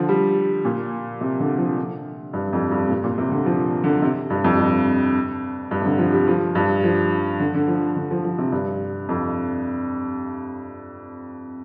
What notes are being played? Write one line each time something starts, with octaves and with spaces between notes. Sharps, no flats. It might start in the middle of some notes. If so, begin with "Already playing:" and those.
Already playing: D3 F3
G3
A#2
C3
D3
F3
D3
G2
F2
G2
A#2
A#2
C3
D3
F3
D3
C3
G2
F2
G2
G2
C3
D3
F3
G3
F3
G2
F3
D3
D3
F3
D3
F3
F3
C3
G2
F2